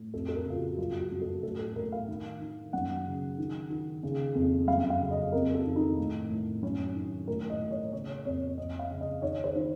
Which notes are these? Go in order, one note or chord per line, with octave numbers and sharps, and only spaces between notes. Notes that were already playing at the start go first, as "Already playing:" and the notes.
Already playing: A2
F2 A4
A4
A#4
C#3 F4
F#4
F#2 F4
F#4
F#2
A4
A2 A4
A4
A2 A#4
F5
D#3
D#3
F#2 F#5
C#3
D#3
D#3
C#3
F2
F#2 F5
F5
C#3
D#5
F2 A#4
A4
D#3
D#4
A2
A2
F#2 C#4
D#3
A2 A#4
D#5
A2
C#5
C#3 C#5
F2 C#5
F2 D#5
F5
C#3
D#5
D#3 C#5
C5
D#3